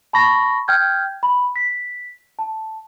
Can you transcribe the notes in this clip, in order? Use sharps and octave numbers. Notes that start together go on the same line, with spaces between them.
A5 B5 C#6 A#6
G5 F6 G6 G#6
B5
B6
A5